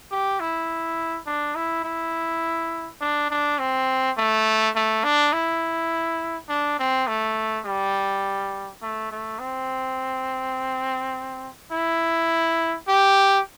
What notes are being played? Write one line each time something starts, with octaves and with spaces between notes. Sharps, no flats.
G4
E4
D4
E4
E4
D4
D4
C4
A3
A3
D4
E4
D4
C4
A3
G3
A3
A3
C4
E4
G4